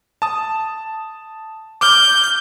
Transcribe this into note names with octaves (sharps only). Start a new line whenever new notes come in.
A5 D#6
D6 F6 G6